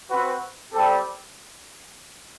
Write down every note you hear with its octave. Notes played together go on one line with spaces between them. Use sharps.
C4 F#4 B4
G3 C4 G4 A4